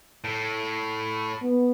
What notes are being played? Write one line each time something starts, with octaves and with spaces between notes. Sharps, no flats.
A2
B3